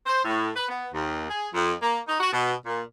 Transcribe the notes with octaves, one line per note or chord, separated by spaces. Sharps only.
C5
A2
B4
B3
D#2
G#4
F2
A#3
D#4
F#4
B2
A#2